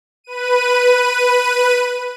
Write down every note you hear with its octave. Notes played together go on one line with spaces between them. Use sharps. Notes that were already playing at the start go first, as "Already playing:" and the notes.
B4 D#7